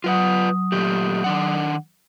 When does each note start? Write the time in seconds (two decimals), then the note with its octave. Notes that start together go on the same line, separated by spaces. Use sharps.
0.04 F#3 F4 B4 F#5 D#6
0.72 A#2 A3 G4
1.24 D#3 D4 F#5